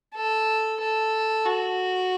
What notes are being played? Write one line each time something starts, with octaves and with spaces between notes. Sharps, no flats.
A4
A4
F#4